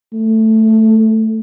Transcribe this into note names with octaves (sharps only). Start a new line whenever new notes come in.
A3